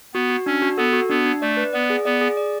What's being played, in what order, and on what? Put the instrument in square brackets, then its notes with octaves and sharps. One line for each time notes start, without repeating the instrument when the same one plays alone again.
[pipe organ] B3 [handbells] F#4
[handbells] F#4
[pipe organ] C#4 [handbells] D4
[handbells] F#4
[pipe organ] B3 [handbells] A4
[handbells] F#4
[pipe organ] B3 [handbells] D4
[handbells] D4
[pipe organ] A3 [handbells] D5
[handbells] B4
[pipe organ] B3 [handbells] D5
[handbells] G#4
[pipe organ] B3 [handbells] D5
[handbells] G#4
D5